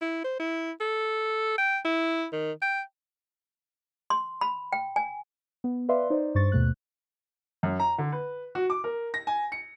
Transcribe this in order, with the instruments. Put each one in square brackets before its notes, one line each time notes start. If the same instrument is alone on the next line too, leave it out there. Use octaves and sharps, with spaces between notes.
[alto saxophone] E4
C5
E4
A4
G5
E4
D#3
G5
[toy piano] C6
B5
G5
G#5
[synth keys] B3
B4 D5 E5 F5 C6
D#4 C5 D5
G2 C5 C#6 A6
D#2 B2 A3 F#6
[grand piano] F#2
A#5
D3
B4
F#4
D6
A#4
A#6
G#5
C#7